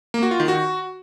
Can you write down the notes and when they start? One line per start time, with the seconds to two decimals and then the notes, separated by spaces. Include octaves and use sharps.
0.14 A#3
0.23 F#4
0.31 F4
0.40 D#3
0.48 F#4